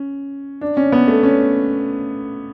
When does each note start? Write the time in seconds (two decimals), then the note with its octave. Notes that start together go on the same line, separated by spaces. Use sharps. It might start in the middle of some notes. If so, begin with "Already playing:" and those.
Already playing: C#4
0.61 D4
0.77 C#4
0.92 B3
1.08 A3
1.23 C#4